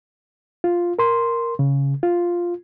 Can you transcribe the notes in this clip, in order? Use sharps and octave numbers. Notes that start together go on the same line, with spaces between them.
F4
A#4 C6
C#3
F4